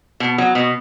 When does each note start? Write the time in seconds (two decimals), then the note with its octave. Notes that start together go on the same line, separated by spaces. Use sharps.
0.20 B2
0.38 F#3
0.55 B2